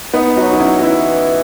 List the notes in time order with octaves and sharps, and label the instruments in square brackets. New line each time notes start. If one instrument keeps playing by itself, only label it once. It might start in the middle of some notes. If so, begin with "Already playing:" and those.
[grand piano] B3 D#4
[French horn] F#3 [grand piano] D#4 F#4
[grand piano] D#4
C#4 E4
F#4
[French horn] E3 [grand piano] C#4 E4